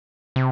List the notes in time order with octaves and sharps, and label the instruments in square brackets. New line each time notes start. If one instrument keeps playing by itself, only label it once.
[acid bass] C3